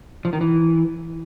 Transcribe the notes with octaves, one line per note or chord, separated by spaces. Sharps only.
F3
D#3
E3